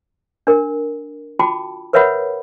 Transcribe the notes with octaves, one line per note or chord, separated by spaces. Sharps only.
D4 A#4
F4 F#4 G5 A5 B5 D6
A#4 B4 C#5 E5 F#5 B5